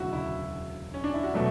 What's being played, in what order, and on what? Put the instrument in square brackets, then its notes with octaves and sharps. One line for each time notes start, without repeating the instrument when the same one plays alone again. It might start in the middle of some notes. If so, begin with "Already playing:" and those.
Already playing: [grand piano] E1 D2 C#3 F#3 [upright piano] E4 F#4
[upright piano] E4
C#4
D4
E4
F#4
[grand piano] B2 F#3 A3